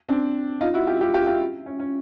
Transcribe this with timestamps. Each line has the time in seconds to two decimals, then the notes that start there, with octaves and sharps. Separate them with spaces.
0.09 C4 D4
0.61 D#4 F4
0.74 E4 F#4
0.87 F4 G4
1.01 F4 G4
1.14 F4 G4
1.27 F4 G4
1.66 C#4
1.79 C#4